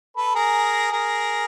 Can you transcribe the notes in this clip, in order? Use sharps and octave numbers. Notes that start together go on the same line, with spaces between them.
A4 B4
G#4 A#4
G#4 A#4